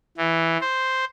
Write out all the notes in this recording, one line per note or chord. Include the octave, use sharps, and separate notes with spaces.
E3
C5